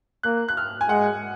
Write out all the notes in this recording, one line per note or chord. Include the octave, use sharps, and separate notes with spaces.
A#3 F#6
F#6
F6
G#5
G#3 F#5